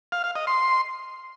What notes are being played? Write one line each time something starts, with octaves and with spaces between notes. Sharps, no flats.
F5
F5
D#5
C6